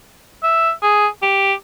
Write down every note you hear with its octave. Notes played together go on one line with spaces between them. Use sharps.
E5
G#4
G4